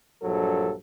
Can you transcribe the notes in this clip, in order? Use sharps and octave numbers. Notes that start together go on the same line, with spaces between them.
A#1 G2 F#3 A4